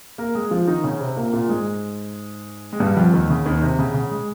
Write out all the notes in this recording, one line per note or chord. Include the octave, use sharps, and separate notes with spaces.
A#3 A#4
G#3 G#4
F3 F4
D#3 D#4
C#3 C#4
C3 C4
A#2 A#3
A#2 A#3
G#2 G#3
G#3
G2 G3
F2 F3
D#2 D#3
C#3
D#2 D#3
C3
C#3
C#3
G#3